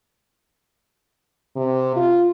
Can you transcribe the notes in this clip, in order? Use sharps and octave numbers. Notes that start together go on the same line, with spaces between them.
C3
F4